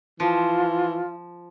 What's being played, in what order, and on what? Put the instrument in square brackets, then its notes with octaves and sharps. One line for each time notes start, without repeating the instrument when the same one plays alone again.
[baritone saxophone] E3 [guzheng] F3 [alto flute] F4